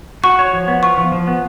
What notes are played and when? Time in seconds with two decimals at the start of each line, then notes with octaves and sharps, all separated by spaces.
0.24 F#4 C#6
0.39 C#5
0.53 F3
0.68 B3
0.83 F4 C#6
0.98 F3
1.12 F3
1.27 B3